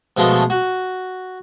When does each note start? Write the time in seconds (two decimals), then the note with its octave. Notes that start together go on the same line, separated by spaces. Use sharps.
0.17 B2 F3 G#3 A3
0.50 F#4